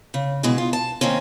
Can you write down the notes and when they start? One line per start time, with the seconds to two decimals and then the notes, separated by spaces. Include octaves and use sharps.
0.14 C#3
0.43 B2 E3 G#3 G#4
0.58 F4
0.73 A5
1.01 D#3 A#3 C4 C#4